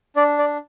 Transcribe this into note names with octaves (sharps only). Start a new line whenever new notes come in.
D4 D5
D5